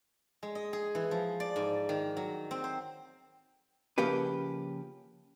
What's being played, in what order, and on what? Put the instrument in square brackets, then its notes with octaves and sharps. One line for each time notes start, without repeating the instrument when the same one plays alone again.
[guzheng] G#3
D#5
G#4
E3
F3
D5
G#2
D#3
F#3
C4
C5
[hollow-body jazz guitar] C#3 F3 A#3 C#4 G4 B4